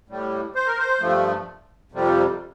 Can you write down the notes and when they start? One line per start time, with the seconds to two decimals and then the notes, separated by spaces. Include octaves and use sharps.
0.09 A2 G3
0.55 C5
0.67 A#4
0.78 C5
1.00 G2 F3 A3
1.92 F2 C3 G3